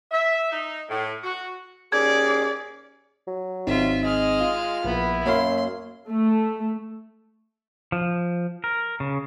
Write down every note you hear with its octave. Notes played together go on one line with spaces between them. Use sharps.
E5
D#4
A2
F#4
D#2 C#4 G#4 D5 G#6
F#3
G#1 C4 D#4 F4 E5
G#3 D#5 F6
F4
A#1 A#2 B3 E4
F#2 A#3 C#5 F5 C6
A3
F3
A#4
C#3